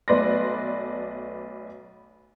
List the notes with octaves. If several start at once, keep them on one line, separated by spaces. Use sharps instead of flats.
B1 A3 B4 D5 C6 A#6